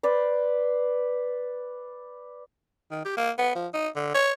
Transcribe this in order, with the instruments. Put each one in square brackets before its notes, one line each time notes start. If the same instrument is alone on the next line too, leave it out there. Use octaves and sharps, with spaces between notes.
[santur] B4 C5 D5
[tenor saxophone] D#3
G4
A#3
B3
F3
D#4
D3
C#5